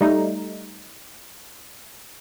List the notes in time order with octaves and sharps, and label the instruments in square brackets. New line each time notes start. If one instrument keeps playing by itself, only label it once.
[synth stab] G3 A3 D#4